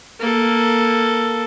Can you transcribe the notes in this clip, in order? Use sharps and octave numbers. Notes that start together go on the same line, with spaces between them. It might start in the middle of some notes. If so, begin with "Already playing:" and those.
A#3 A4